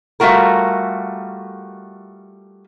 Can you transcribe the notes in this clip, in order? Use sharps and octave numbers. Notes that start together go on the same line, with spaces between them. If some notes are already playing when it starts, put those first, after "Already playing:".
G3 A3 F4 F#4 A#4